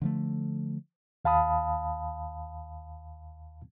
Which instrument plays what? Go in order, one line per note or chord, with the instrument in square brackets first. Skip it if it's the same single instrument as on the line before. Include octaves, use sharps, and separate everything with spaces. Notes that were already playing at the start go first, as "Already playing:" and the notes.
[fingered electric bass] D3 F3 A3
[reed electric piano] D#2 F5 A5 B5 D#6